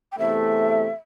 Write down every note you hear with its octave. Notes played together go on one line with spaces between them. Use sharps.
G5
E2 C3 A3 E5